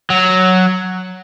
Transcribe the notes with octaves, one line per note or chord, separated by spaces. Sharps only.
F#3